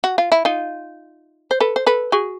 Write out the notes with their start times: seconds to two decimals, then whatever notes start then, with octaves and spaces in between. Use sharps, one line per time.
0.04 F#4
0.18 F4
0.32 E4
0.45 D#4 F4
1.51 C5
1.60 A4 B4
1.76 C5
1.86 A4 B4
2.12 F#4 G#4